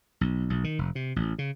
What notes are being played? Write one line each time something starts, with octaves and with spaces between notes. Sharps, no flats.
B1
B1
D#3
F1
C3
A1
C#3